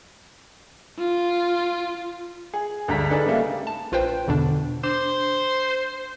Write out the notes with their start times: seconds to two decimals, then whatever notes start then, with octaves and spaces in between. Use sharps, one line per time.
0.99 F4
2.54 G#4
2.88 D2 G2 G#3 D4 A#5 B6
3.10 D4 D#4 G#4 A4 B4
3.25 C#3 G3 A3 A#3
3.67 A5
3.92 A#1 F4 B4 C5 G5
4.28 E2 B2 D3 D4
4.84 D4 C5